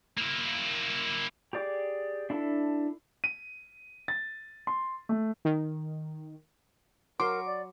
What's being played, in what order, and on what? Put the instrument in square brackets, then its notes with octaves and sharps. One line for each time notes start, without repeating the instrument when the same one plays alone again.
[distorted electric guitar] A#3 E4
[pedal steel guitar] G4 G#4 D5 D6
D4 E4 A4
[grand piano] D#7
A6
C6
A3
[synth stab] D#3
[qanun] F#3 [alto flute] A#4 [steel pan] C6 [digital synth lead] D6
[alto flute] D5